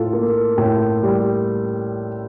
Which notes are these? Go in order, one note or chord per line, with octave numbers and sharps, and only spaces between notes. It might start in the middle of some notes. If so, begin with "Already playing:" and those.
Already playing: A2 F4 A4
A#3
A2
G3